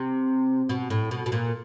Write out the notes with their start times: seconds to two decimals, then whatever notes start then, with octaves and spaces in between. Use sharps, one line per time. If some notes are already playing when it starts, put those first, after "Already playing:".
Already playing: C3
0.69 B2
0.90 A2
1.11 B2
1.26 B2
1.32 A#2